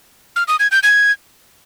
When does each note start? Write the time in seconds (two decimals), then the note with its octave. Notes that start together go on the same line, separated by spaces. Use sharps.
0.36 F6
0.48 D#6
0.60 G#6
0.71 G6
0.83 G#6